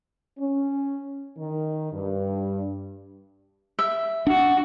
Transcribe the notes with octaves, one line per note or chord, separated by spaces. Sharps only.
C#4
D#3
G2
E5
D4 F#4